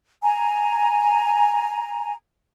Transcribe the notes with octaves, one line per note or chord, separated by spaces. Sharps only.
G#5 A#5